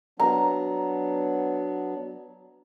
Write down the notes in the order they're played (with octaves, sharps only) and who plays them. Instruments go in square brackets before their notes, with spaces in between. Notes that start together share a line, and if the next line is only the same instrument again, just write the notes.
[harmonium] F#3 B3 D4 [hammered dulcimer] A#5